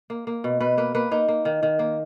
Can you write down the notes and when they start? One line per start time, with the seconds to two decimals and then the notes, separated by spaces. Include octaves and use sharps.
0.10 A#3
0.27 A#3
0.44 B2
0.60 B2 B4
0.78 A#3 B4
0.95 A#3 B4
1.11 A#3 D#4
1.28 A#3
1.45 D#3
1.63 D#3
1.79 A#3